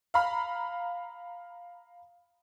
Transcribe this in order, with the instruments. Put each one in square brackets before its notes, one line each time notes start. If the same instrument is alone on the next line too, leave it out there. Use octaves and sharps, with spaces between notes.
[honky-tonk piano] F5 A#5 B5 F6